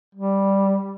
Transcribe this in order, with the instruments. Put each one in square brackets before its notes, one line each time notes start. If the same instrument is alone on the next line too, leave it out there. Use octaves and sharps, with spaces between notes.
[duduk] G3